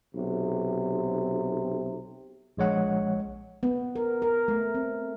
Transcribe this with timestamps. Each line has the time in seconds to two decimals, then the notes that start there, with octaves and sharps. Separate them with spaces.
0.15 B1 C3
2.57 A#1 G#3 C#5 F#5
3.63 B3
3.96 A#4
4.22 A#4
4.48 A3
4.75 C4